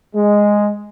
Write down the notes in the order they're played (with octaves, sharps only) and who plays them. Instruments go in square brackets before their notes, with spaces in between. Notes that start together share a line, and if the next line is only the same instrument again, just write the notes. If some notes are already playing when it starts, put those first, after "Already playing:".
[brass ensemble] G#3